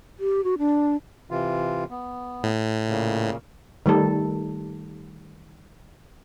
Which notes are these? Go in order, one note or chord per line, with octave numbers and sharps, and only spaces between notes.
G4
F#4
D4
C3 E3 F4
B3
A2
A#2 C#3
D#3 G3 A3 A4